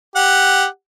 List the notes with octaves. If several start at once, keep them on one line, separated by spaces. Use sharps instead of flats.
G4 F#5